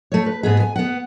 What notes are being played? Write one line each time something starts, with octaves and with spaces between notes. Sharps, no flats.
A3 C#5
B4
G#2 B3 G#4
G#5
B3 F#5